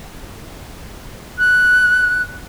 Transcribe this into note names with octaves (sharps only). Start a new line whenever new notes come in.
F#6